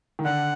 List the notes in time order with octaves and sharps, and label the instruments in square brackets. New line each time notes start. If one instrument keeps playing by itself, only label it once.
[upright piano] D#3
[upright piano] D3 [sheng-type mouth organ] F#5